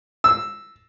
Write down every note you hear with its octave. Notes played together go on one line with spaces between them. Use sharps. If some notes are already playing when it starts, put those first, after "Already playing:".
E6